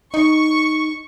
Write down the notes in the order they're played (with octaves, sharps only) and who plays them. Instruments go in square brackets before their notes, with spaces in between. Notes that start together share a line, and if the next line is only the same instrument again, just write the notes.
[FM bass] D#4 [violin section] C#6